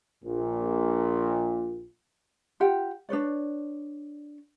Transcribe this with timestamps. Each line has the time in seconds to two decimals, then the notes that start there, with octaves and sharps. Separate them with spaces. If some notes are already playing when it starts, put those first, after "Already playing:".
0.24 A#1 A#2
2.60 F4 G4 F#5 G5
3.09 D4 B4 C#5 D5